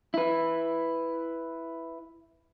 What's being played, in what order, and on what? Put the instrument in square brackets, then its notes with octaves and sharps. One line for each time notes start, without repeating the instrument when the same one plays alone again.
[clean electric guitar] E4 B4